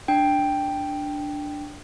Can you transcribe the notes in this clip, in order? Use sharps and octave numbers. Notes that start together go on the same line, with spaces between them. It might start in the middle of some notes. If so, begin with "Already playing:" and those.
D4 G5